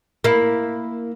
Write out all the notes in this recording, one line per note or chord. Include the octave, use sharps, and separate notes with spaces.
A#3 E4